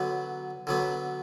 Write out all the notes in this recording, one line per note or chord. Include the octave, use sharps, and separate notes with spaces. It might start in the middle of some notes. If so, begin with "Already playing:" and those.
Already playing: D3 F#3 B3
D3 F#3 B3